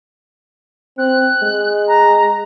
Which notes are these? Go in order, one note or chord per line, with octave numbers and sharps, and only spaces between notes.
C4 F#6
G#3
A#5